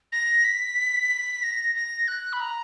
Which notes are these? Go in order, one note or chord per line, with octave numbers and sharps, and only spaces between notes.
A#6
B6
A#6
A#6
F#6
B5
A#5